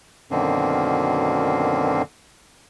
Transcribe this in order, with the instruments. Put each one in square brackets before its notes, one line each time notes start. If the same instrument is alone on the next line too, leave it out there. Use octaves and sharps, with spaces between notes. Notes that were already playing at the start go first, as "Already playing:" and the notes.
[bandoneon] F#2 B2 D3 D#3 A#3 C4